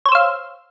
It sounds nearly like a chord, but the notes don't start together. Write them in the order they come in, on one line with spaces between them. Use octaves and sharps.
C#5 C5 E6 F5